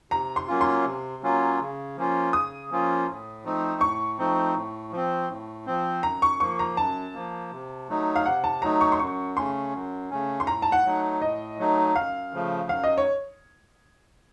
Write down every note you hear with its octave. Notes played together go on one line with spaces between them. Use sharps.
C3 A#5
C6
F#3 A#3 C#4 F4
C6
C3
F#3 A#3 C#4 F4
C#3
F3 A#3 C#4 F4
C#3 D#6
F3 A#3 C#4 F4
A2
F3 A3 C4 D#4
A2 C#6
F3 A3 C4 D#4
A2
F3 C4
A2
F3 C4
F#2 A#5
C#6
F3 A#3 C#6
A#5
F#2 A5
F3 A#3
C3
F#3 A3 D#4
F5
C3 F#5
A5
F#3 A3 D#4 A#5
C#6
C6
F#2 C#6
C#3 A3 C#4 C6
F#2
C#3 A3 C#4
C6
A2 A#5
A5
F#5
F#3 A3 D#4
A2 D#5
F#3 A3 D#4
F#2 F5
C#3 F3 A3
F#2 F5
D#5
C#5